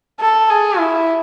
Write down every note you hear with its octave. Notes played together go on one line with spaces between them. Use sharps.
A4
G#4
E4